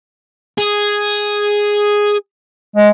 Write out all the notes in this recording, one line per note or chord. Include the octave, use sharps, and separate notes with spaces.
G#4
G#3